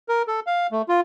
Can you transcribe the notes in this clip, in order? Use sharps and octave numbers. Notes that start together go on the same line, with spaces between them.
A#4
A4
F5
A3
F4